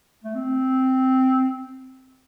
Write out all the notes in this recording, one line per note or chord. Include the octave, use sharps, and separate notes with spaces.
A3
C4